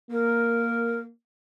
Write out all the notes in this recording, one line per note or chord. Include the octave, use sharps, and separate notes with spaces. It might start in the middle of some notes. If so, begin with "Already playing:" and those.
A#3 A#4